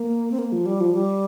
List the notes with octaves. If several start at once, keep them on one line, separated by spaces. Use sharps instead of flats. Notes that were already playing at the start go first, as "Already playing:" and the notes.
Already playing: A#3
C4
A#3
F3
G3
F3
G3